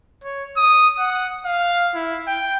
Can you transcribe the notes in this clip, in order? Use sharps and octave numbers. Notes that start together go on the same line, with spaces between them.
C#5
D#6
F#5
F5
E4
G5